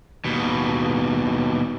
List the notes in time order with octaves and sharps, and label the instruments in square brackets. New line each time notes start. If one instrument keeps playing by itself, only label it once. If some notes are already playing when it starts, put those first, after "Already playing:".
[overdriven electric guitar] D#2 B2